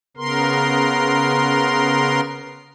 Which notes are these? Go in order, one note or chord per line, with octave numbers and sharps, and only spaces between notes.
C#3 B3 A#4 C6